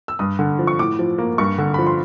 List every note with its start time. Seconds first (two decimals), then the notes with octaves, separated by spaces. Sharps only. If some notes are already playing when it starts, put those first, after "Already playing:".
0.08 E6
0.19 G2 D#6
0.39 D3
0.59 F3
0.67 C#6
0.79 A2 D6
0.99 F3
1.18 A#3
1.38 G2 C#6
1.58 D3
1.74 F3 B5
1.86 C6